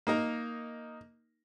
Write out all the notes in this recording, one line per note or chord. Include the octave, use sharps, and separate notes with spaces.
A#3 D#4 A#4